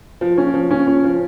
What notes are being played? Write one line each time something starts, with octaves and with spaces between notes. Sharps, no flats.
F3
C#4
F3
C#4
C#4
F3